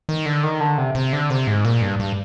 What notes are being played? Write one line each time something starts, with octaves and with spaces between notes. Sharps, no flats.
D#3
D3
D#3
D3
C3
C3
D3
C3
G#2
A#2
G2
G2